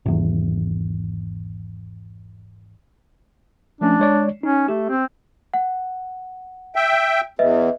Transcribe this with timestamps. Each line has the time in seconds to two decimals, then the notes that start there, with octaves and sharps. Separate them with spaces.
0.06 G#1 E2
3.81 F3 A3 C#4 D4
4.00 G#3 C#5 D5
4.43 C#4 D#4
4.68 A3 G4
4.90 C4
5.54 F#5
6.75 E5 G5
7.39 E2 B4 D#5 E5